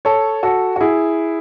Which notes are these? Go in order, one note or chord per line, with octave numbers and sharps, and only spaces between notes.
A4 C#5
F#4 A4
F#4
E4 G#4